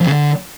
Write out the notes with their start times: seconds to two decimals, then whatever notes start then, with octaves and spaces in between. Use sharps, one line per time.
0.01 F2
0.06 C#3
0.12 D3